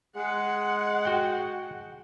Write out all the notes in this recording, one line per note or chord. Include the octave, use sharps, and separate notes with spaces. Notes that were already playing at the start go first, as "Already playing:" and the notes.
G#3 F#5
F#4 G5